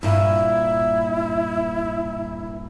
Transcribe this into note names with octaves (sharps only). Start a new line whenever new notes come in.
G2 A#2 E4